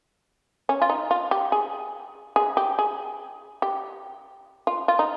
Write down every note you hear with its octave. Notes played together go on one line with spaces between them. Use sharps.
C#4
F4
D#4
F4
G4
G#4
G#4
G4
G#4
G4
F4
F4
D#4